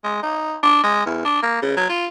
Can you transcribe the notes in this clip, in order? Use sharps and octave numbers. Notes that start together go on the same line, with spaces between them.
G#3
D#4
D4
G#3
E2
D4
A#3
C#3
F#3
F4